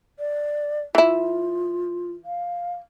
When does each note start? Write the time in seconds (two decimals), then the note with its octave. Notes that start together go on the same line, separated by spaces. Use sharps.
0.19 D5
0.95 E3 E4 F4
2.25 F5